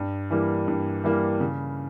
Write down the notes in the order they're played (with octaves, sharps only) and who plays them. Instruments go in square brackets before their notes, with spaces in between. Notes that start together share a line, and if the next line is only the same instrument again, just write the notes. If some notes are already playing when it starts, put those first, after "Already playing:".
Already playing: [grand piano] G2
E3 G3 A#3
G2
E3 G3 A#3
C#3